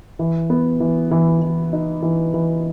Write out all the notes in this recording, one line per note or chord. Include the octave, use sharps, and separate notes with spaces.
E3
B3
E3
E3
E3
D#4
E3
E3